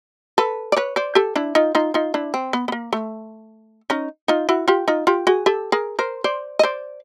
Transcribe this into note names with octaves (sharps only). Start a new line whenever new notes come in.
A4 B4
D5
B4 C#5
C5 D5
G4 A4
D4 E4
D#4 F4
D#4 F4
D#4 F4
D4 E4
C4
B3
B3
A#3
A3
C#4 D#4
D#4 F4
E4 F#4
F4 G4
D#4 F4
F4 G4
F#4 G#4
G4 A4
G#4 A#4
A#4 C5
C5 D5
D#5
C5 D5